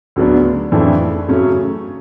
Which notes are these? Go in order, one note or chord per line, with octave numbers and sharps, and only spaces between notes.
D2 C#3 F#3 B3 D4
F2 C#3 E3 A3 D4
F#2 C#3 F#3 A3 C#4